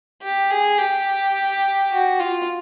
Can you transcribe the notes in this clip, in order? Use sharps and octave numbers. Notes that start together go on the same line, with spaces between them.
G4
G#4
G4
F#4
F4